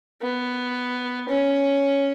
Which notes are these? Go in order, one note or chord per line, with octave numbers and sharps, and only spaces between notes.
B3
C#4